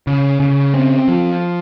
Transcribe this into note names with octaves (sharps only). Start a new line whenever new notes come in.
C#3
C#3
C4
F3